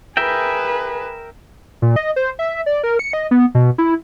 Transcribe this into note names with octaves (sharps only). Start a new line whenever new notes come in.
G#4 A#4 B4 E5 G5
A#2
D#5
C5
E5
D5
A#4
C#7
D#5
B3
B2
E4